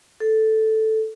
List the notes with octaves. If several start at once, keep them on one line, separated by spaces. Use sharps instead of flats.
A4